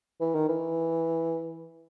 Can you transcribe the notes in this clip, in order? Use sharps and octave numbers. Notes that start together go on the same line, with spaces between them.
E3
D#3
E3